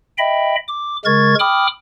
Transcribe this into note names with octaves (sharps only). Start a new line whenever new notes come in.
D#5 E5 G5 B5
D6
C#3 G#3 A#4 C#6 G#6 A6
G5 B5 D6 D#6 F6